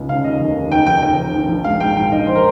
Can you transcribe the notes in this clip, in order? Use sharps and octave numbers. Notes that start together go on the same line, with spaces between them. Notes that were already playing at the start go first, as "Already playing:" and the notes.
Already playing: C#2
C#3 F5
D#2 D#5
F1
D#2
F1 G5
F1 G5
F1 G5
F1
A#1
A#1
G#2 F5
G#2 G5
A#1 G5
A#1 D#5
C5
A#4